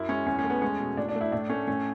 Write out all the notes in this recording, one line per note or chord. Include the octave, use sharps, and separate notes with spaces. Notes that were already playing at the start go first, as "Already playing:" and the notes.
Already playing: F#2 E4
G#3 C#4
E2 C#4
C#4
A3
B3
G#3 C#4
B2
A2 D4
D4
A3
E4
A2 D4
A3 C#4
A2 C#4